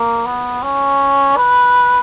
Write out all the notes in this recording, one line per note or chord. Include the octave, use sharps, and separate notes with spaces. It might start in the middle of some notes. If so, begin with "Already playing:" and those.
Already playing: A#3
B3
C#4
B4